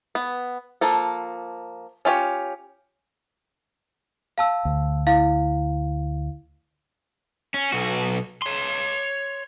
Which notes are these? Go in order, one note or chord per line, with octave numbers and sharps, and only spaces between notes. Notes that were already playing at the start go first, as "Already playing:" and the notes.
B3
F3 A#3 A4
C#4 F4 G4 C#5
F5 A5 E6
D2
E4 F5
C#4
B1 F#4
C#5 C6